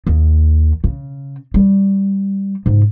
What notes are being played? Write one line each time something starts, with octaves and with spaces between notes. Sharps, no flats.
D#2
C#3
G3
G#2 C#3